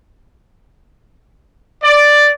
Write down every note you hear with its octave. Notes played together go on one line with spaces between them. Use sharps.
D5